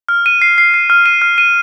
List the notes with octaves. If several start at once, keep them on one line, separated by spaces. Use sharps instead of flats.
F6
D#7
C7
C7
C7
F6
D#7
F6
D#7